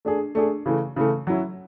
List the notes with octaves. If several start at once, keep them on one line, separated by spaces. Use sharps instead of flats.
A3 D4 G#4
A3 D4 G#4
C#3 E3 A3
C#3 E3 A3
F#3 C#4 E4